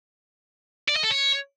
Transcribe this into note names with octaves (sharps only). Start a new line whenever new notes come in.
D5
D#5
A4
C#5